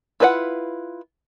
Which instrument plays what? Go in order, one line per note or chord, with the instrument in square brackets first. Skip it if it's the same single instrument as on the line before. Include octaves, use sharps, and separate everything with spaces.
[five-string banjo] E4 F4 B4 E5 F#5